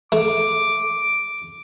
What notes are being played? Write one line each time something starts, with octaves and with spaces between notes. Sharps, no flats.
A3 D6